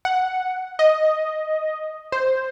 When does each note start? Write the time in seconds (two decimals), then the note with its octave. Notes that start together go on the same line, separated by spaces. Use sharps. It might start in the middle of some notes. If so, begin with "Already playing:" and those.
0.05 F#5
0.79 D#5
2.12 C5